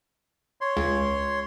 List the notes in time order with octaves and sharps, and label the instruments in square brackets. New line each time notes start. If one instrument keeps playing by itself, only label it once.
[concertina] C#5 C6
[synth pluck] C#2